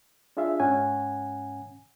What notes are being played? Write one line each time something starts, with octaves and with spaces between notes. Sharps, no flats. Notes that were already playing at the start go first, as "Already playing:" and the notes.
D4 F4 G#4 E5 F5
G#2 C#4 F#5 G#5